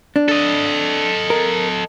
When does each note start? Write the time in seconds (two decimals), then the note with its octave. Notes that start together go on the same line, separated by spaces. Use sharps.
0.16 D4
0.29 A4 D#5
1.30 A#4